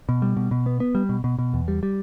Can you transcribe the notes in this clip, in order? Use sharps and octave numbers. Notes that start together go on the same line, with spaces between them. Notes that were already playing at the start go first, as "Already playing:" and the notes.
B2
G3
B2
B2
B3
B3
G3
B2
B2
B2
E2
G3
G3